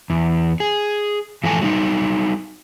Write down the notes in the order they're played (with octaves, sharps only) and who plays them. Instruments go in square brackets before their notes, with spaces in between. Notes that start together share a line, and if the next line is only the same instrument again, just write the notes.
[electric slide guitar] E2
G#4
G#2 E3 F3 A4 G#5
F#3 G3 D#4